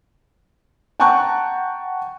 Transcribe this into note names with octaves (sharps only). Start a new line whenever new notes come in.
F#5 G5 A5 A#5 C#6 F#6